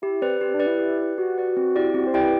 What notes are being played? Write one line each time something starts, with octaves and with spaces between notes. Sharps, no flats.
E4 G4
C4 B4 D5
C4 G4
D4
B4 D5
E4
G4
B4 D5
F#4 G4
B4 D5
C4
E4 G4 D5 G5
C4 F#4
C5
E4 G4 D5 G5
B4